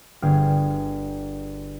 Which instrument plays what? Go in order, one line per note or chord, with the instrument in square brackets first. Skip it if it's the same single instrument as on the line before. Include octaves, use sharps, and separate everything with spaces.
[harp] G1 G#4 G5 F6